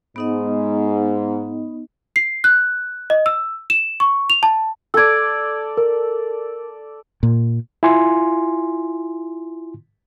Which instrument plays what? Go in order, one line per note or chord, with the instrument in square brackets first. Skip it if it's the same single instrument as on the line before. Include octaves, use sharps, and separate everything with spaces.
[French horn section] G#2 [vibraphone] B3 D#4 D#5
[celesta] C7
F#6
D#5
E6
E7
C#6
F7
A5
[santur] A4 D5 [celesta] E6 G#6
[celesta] A#4
[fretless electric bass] A#2
[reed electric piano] E4 F4 G#5 C6